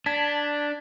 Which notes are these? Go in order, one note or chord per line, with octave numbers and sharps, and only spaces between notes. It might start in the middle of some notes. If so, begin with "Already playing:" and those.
D4 A5 G#6 B6